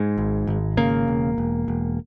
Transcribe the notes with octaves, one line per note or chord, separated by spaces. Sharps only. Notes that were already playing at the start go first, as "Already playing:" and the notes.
Already playing: G#2 G#3
G#1
G#1
C#3 A#3
E1
E1
E1